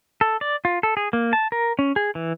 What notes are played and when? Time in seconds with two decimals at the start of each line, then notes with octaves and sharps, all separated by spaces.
0.21 A4
0.41 D5
0.65 F4
0.83 A4
0.97 G#4
1.13 A#3
1.33 A5
1.52 A#4
1.79 C#4
1.96 G#4
2.15 E3